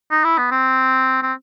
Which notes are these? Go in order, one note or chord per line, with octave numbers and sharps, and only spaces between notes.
D#4
E4
B3
C4
C4